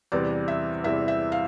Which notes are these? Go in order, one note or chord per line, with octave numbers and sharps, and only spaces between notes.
E2 C3 E3 G3 D5
E5
E2 C3 E3 G3 E5
E5
F5